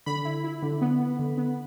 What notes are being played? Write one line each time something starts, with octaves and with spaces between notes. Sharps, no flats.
D3 B5
E4
E4
D3
B3
B3
D3
B3